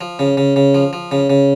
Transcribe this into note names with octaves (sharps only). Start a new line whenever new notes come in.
F3
C#3
C#3
C#3
F3
F3
C#3
C#3